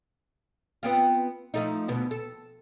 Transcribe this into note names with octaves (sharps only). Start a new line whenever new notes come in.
B3 C4 F4
F3 A3 D#4
D2 B2 B3
A4